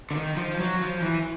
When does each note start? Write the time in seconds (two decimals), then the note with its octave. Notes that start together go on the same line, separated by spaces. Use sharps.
0.11 D3
0.15 D#3
0.37 F3
0.59 F#3
0.81 F3
1.02 E3